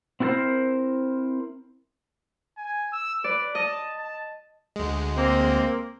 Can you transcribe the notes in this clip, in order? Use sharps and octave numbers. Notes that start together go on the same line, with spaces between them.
C4 E4 F#4 A4 A#4 C5
G#5
E6
B4 D5
D#5 A5
A5
D2 G#3
A#3 C4